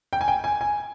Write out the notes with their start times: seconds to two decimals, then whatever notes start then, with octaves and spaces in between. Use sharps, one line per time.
0.13 G5
0.21 G#5
0.28 G5
0.44 G#5
0.61 G#5